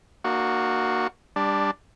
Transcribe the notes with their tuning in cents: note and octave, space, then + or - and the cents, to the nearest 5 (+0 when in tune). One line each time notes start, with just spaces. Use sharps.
A#3 +0 D4 +45 F#4 +0
G3 +20 D4 +0